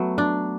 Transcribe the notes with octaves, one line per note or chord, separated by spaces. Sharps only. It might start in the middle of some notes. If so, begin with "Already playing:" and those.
Already playing: F#3 A3 B3
D4